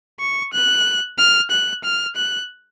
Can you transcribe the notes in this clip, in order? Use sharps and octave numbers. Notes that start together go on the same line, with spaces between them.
C#6
F#6
F6
F#6
F6
F#6